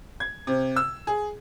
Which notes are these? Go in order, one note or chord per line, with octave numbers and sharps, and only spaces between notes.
G#6
C3
E6
G#4